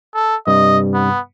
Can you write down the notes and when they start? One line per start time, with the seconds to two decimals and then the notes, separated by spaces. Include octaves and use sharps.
0.15 A4
0.47 G2 C3 G3 D#5
0.94 B3